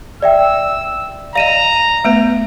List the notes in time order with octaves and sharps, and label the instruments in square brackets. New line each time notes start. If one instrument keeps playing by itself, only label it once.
[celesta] D5 E5 G5 [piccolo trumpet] E6
[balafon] D5 D#5 [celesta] F5 D#7 E7 [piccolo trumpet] A#5
[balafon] A3 B3 B4